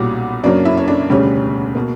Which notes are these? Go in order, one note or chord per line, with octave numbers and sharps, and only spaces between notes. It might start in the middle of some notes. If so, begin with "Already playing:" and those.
Already playing: B1 A#2 G3 C#4 E4 F#4 F#5
F#2 C#3 F#3 A#3 C#4 D4 D5
E4 E5
C#5
D4 D5
E1 D2 C#3 G3 C#4
B2 A#3